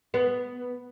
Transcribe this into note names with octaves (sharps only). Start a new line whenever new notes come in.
B3